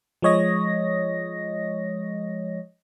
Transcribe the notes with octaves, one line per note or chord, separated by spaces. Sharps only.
F3 G#3 C#5 D#5 A#6